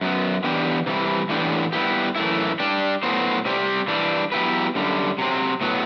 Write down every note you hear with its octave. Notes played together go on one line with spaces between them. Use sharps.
F#2 F#3 B3
E3 B3 D4 G4
C3 E3 G3
A2 E3 B3 D4 G4
G3 B3 E4 G4
F#2 E3 A3 E4
G3 D4 G4
A2 F#3 B3 F#4 C5
C3 G3 C4 G4 D5
E3 G3 D4
F#3 B3 E4 G4 B4
F#2 D3 G3
C3 F#3 C4
A2 F#3 B3